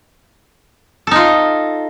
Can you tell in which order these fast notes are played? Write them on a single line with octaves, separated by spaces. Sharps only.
A4 D#4 F4